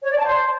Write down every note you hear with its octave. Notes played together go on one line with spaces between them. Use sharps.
C#5
D5
A5
C5